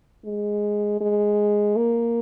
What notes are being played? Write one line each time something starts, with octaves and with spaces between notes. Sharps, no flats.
G#3
G#3
A#3